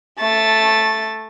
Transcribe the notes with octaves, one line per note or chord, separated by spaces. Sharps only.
A3 A6